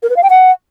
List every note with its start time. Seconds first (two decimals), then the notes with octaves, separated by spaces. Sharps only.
0.03 A#4
0.10 B4
0.16 F5
0.23 G5
0.30 F#5